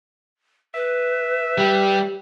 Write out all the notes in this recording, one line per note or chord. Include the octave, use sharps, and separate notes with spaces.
B4 E5
G3 G4